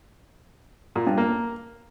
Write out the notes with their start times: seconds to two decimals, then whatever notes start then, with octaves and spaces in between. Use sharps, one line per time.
0.96 A#2
1.07 G2
1.18 A#3